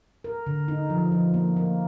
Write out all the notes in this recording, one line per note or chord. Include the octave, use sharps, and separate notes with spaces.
A#4
D3
D#4
F3
F3
A#3
A#3